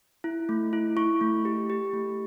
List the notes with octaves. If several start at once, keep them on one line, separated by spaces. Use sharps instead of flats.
E4
A3
E4
E4 C#6
A3
G4
G4
A3